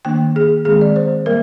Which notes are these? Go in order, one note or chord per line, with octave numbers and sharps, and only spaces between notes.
D#3 A#3 D4 G5
G#4
D#3 G#3 C4 G#4
D5
C5
G3 A#3 A#4